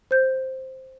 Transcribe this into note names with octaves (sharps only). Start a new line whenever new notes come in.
C5 G6